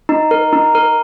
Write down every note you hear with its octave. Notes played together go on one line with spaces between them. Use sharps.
D#4
A#4
D#4
A#4